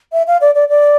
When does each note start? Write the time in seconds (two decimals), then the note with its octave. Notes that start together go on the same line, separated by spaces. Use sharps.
0.13 E5
0.27 F5
0.41 D5
0.55 D5
0.69 D5